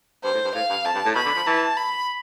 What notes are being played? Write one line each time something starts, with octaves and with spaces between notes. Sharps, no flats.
G2 C5
A2
G2
A2 F5
G2
F2 A5
G2
A2
B2 B5
D3
F3
E3 A5
B5